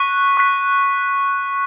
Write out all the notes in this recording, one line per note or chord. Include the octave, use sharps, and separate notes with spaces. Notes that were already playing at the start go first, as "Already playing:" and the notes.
Already playing: C#6 F#6 B6
C#6 F#6 B6